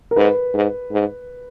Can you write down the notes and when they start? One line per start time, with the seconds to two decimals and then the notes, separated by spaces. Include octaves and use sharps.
0.11 A#4
0.16 G#2 B4
0.54 G#2
0.92 G#2